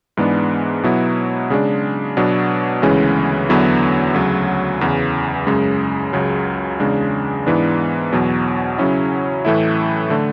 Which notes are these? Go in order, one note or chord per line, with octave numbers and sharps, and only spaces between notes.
G#2 E3 G#3 B3 D4
B2 F#3 B3 E4
C#3 G#3 D4
B2 F#3 B3 D4
D2 C#3 E3 G#3 C#4
E2 D3 F#3 B3 E4
D2 C#3 F#3
E2 C#3 E3
F#2 C#3 G#3
C#2 C#3 F#3
E2 C#3 G#3 D4
G#2 E3 B3 D4
E2 B2 F#3
C#3 F#3 C#4 E4
A2 E3 A3 E4
D3 A3